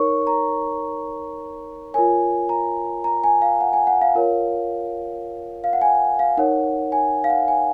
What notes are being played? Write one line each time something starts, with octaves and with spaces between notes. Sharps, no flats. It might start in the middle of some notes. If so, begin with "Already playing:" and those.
Already playing: D#4 A#4 C#5 C#6
A#5
F4 A#4 C#5 G#5
A#5
A#5
G#5
F5
F#5
G#5
F#5
F5
F4 A#4 C#5 F5
F5
F#5
G#5
F5
D#4 A#4 C#5 F#5
G#5
F5
F#5
G#5